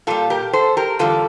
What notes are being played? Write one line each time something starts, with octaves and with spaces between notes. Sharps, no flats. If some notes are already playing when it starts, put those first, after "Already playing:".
A#2 G3 F4 A4
G4 A#4
A4 C5
G4 A#4
E2 D3 G3 F4 A4